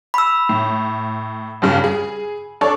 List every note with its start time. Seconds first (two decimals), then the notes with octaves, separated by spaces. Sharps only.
0.14 B5 E6
0.49 A2
1.62 C#2 G2 C#3
1.84 G#4
2.61 D4 A4 C#5